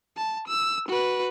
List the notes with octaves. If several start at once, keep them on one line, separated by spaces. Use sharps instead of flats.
A5
E6
F#4 B4